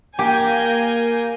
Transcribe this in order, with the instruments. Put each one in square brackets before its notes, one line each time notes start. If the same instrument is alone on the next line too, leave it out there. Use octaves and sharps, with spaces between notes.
[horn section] A#3 [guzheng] G4 [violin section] G#5 G6 A#6